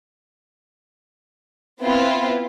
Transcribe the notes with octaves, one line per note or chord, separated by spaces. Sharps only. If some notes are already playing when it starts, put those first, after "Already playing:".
B3 C4 E4 F4 B4